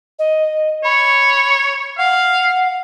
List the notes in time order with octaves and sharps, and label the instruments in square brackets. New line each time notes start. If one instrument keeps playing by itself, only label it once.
[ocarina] D#5
[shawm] C#5 [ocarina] B5
[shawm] F5 [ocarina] F#5